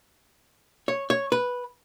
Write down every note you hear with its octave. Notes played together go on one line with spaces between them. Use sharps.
C#5
C#5
B4